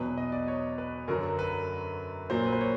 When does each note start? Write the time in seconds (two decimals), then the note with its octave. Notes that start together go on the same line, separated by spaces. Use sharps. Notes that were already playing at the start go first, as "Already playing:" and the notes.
Already playing: E2 B2 F#3 B4
0.17 D#5
0.32 D5
0.48 C#5
0.78 B4
1.08 F#2 D3 F#3 A#4
1.39 B4
2.30 A#2 F#3 C5
2.46 B4
2.53 C5
2.61 C#5